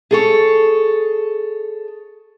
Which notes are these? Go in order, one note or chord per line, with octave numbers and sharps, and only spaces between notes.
G#4 A4 C#5